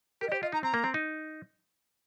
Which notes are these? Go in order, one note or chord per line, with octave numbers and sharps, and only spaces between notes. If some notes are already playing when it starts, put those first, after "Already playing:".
G4 A#4
D#5
G4 C5
F4 D#5
D#4 A#5
C4 A#5
A#3
C4
D#4